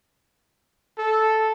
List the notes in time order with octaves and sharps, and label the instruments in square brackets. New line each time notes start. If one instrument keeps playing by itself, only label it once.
[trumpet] A4